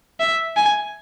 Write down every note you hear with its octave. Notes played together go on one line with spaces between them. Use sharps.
E5
G#5